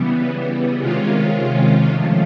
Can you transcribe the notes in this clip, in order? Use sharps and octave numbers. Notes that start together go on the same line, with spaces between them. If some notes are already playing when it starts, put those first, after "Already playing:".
Already playing: C#3 E3 G3 B3
C3 D#3 G#3 C#4 F4
F3 A3 C#4 F4